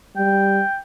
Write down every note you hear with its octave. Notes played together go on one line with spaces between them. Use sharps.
G3 G5